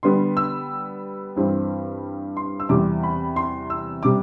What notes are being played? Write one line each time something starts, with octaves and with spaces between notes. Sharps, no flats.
D3 G3 B3 C6
E6
G2 E3 G3 C4
C6
E6
E2 C3 G3 D6
B5
C6
E6
C3 G3 D6